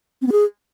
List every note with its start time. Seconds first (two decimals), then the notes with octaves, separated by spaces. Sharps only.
0.22 C4
0.27 B3
0.32 G#4